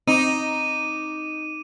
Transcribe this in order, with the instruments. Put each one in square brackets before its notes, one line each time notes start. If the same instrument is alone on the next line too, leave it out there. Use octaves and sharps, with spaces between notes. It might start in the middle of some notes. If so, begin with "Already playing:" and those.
[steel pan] C4 [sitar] D#4 [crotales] D6 D#7